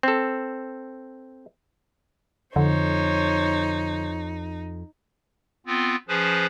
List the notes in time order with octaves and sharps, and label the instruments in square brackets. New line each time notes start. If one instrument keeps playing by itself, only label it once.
[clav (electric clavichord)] C4 A4
[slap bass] F2 [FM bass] D3 [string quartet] D#4 [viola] C5 C#5
[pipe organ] B3 C4 F4
F3 C#4 G#4 B4 C5